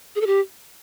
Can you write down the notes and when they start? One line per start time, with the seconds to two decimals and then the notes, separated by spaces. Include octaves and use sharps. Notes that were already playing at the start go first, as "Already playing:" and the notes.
0.15 G#4
0.21 A4
0.27 G4